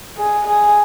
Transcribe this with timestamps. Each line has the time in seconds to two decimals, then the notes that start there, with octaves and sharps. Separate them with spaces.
0.18 G#4
0.47 G#4